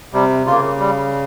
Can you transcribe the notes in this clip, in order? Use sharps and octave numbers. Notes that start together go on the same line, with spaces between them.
C3 G3
C#3 A#3 F4
G3